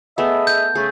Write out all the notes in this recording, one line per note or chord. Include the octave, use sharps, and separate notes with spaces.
A3 B3 G#4 D#5 E5
G6
C#3 A3 G#4